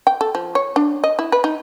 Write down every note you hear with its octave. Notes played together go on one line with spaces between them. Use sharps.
G5
A4
F3
C#5
D4
D#5
E4
B4
D#4